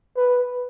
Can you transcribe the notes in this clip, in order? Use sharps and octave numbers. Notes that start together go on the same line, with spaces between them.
B4